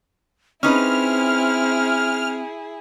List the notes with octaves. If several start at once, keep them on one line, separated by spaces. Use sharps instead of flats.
C4 C#4 D#4 E4 G#4 B4 F6